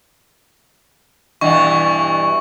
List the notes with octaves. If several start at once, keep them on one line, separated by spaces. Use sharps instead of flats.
G2 B2 E3 C#6